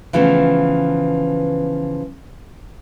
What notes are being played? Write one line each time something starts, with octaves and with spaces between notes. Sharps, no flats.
C#3 E3 F3 A3 B3